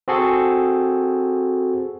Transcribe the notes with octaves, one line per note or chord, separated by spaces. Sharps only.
C4 F#4 G#4 A4